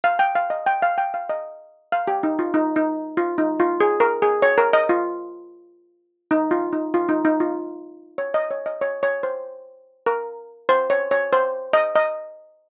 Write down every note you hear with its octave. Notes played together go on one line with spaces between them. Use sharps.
F5
G5
F5
D#5
G5
F5
G5
F5
D#5
F5
G4
D#4
F4
D#4
D#4
F4
D#4
F4
G#4
A#4
G#4
C#5
A#4
D#5
F4
D#4
F4
D#4
F4
D#4
D#4
F4
C#5
D#5
C#5
D#5
C#5
C#5
C5
A#4
C5
C#5
C#5
C5
D#5
D#5